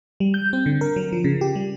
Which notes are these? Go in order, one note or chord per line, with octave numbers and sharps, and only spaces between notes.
G3
G6
C4
D3
A#4
F#3
F3
C#3
G4
G3